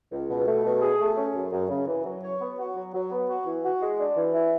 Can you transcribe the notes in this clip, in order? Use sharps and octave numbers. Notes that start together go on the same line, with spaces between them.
C#2
B2
A3
B2
G#4
A3
C#4
F#2
F#2
C#3
E3
F#3
C#5
B3
F#4
F#3
F#3
B3
F#4
E3
F#4
G#3
D4
E3
E4